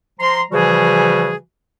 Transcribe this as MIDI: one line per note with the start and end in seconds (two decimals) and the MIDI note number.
0.20 0.40 53
0.20 0.40 82
0.20 0.40 84
0.51 1.34 49
0.51 1.34 52
0.51 1.34 53
0.51 1.34 55
0.51 1.34 66
0.51 1.34 68